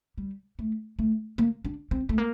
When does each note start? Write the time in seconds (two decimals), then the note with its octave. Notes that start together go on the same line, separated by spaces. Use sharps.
0.18 G3
0.59 A3
0.99 A3
1.38 A#3
1.65 D4
1.91 C4
2.09 A3
2.18 A#3